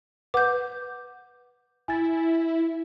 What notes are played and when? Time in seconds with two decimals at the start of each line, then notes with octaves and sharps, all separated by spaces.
0.34 B4 F#5 D6 G6
1.88 E4 G#5 A6